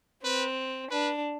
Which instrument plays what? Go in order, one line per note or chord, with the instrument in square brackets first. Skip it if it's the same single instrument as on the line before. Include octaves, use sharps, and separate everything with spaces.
[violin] C4 [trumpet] B4
[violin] D4 [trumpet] B4